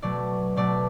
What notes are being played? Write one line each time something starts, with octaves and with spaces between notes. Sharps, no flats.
B2 F#3 A3 D5
B2 F#3 A3 D5